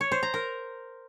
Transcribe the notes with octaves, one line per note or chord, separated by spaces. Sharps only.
C#5
C5
A#5
A#4